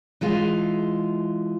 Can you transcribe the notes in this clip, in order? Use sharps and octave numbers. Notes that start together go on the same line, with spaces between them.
E3 G#3 F4